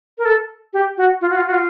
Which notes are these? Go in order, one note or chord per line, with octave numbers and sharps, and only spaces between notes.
A#4
A4
G4
F#4
F4
F#4
F4
F#4
F4